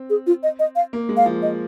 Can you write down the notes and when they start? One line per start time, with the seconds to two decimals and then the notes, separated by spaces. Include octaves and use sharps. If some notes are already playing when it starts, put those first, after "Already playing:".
Already playing: C4
0.10 G#4
0.27 F4
0.43 D#5
0.59 D#5
0.76 F5
0.93 A#3
1.09 G#3
1.17 F5
1.26 F3
1.42 D#5